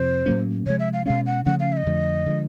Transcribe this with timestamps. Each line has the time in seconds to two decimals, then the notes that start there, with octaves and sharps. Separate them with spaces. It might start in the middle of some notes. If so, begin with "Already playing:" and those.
Already playing: F2 C3 F3 C5
0.26 A2 F#3 A#3 C#4
0.66 C3 F3 G#3 C#5
0.80 E5
0.93 F5
1.06 B2 G#3 C#4 F5
1.26 F#5
1.46 C#3 F3 A3 C#4 F#5
1.60 F5
1.72 E5
1.77 D#5
1.86 F2 D3 F3 A3
2.26 D3 F3 G#3